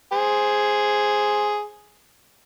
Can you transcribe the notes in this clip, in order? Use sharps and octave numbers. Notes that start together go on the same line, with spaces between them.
G#4 C5